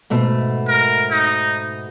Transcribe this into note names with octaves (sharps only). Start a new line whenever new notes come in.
G#2 B2 A3
A#4
D#4